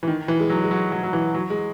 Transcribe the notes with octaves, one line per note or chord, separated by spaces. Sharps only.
E3
D#3
E3
G#3
F#3
G#3
F#3
F#3
F#3
E3
F#3
G#3